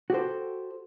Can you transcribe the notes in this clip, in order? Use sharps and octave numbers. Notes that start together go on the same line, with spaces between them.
F#4 G4 A4 C5